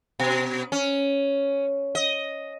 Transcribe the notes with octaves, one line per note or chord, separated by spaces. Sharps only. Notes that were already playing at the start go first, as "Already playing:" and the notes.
B2
C#4
D#5